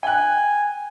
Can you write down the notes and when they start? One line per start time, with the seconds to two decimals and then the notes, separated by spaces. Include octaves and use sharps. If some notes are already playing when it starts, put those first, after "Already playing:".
0.03 G5 G#5 F#6